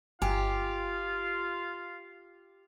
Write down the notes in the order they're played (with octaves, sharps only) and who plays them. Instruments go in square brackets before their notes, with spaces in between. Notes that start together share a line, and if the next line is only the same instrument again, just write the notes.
[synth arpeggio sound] G1 G#5 [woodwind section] F4 [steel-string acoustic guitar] G4 [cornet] F5